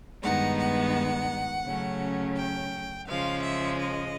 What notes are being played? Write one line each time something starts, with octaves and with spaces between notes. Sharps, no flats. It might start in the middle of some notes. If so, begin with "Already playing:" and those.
G2 D#3 G#3 B3 D#4 F#5
F#5
C#3 F#3 A3 C#4
G5
C#3 F3 G#3 F5
E5
D#5